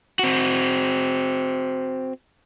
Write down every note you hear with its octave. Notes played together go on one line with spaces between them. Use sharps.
C4 F#4